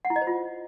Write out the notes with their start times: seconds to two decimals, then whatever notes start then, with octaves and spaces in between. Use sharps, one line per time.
0.05 F#5
0.10 E4
0.16 D#5
0.21 C5
0.27 F4